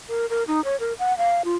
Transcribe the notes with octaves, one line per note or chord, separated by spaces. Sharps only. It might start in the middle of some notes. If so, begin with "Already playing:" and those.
A#4
A#4
D#4
C#5
A#4
F#5
F5
F4